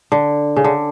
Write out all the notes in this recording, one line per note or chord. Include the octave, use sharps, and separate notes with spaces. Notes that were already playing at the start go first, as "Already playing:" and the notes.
D3
C#3
D3